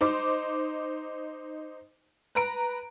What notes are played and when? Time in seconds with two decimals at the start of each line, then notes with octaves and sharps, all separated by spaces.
0.01 D#4 C5 D6
2.35 B4 A#5 D7